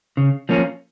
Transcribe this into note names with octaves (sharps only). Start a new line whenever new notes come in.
C#3
F3 A#3 C#4